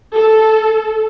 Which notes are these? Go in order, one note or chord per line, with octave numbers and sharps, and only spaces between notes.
A4